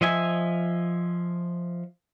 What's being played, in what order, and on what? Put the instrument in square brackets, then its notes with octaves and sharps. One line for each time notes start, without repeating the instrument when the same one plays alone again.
[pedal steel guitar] F3 D#5 E5 G#5